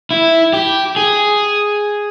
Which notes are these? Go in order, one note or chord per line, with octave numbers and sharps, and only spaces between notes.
E4
G4
G#4